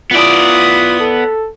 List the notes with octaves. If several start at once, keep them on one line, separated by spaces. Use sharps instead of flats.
B3 E4 F4 D5 D#6
A4